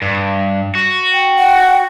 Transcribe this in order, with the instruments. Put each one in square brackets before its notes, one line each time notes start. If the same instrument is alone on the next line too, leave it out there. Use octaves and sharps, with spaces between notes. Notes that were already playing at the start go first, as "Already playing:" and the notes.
[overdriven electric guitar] G2
F#4
[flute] G5
[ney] F#5